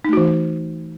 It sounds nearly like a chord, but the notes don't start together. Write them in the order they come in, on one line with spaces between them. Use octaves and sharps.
D#4 A3 F#4 E3